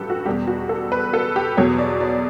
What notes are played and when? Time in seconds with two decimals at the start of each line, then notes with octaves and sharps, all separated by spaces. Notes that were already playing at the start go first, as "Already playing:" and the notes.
Already playing: A1 G2 F#3 G4 A4 B4
0.10 F#4
0.26 E2 B2 G3 G4
0.47 F#4
0.69 A4
0.92 B4
1.13 A4
1.36 G4
1.57 E2 B2 F#3 C#5
1.78 D5
2.00 D5